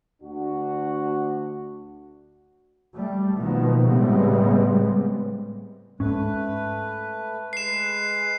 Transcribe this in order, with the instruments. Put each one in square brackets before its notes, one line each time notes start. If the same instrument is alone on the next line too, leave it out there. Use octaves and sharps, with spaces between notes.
[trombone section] D2 D4 F#4
[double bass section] G3 A3
B2 D#3 F3 A#3 B3
A2 C#3 G3 G#3 B3 C4
[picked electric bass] G#2 C#4 [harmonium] A3 B4
[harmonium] G#3 B4 [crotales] C7 E7